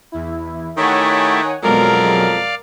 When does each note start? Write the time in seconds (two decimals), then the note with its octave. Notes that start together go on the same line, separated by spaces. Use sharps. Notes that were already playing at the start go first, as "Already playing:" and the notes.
0.12 E2 E4
0.77 D#3 A3 E4 G4 C#5 F#5 G#5
1.63 F2 B2 F#3 G#3 A#4 D5 F5